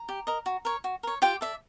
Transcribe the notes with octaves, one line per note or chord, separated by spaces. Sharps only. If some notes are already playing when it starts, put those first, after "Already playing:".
Already playing: A#5
G4
A#4 D#5
F#4
A#4 C#5
F#4
A#4 C#5
F4 G4 G5
A4 D5 E5